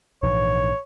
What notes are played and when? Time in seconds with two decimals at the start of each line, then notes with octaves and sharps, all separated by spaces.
0.23 A#1 G#2 E3 C#5